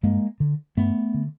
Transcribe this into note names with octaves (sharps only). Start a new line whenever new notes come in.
G2 G#3 A#3
D3
G2 A3 B3
D3